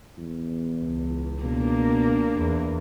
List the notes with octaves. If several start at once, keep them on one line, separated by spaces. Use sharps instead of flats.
E2
C#2
B2 A#3 D4
E2